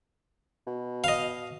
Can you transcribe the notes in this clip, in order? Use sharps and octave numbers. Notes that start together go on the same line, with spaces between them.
B2
D#5 F5